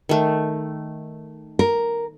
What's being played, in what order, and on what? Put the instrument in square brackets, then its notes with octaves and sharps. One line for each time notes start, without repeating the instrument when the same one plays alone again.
[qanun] D#3 A3
[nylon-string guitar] A#4